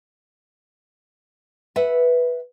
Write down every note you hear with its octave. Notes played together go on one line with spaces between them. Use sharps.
B4 E5 F#5